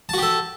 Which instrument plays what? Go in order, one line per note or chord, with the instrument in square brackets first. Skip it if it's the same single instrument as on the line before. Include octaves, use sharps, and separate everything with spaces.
[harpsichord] A5
F#4
G4
A4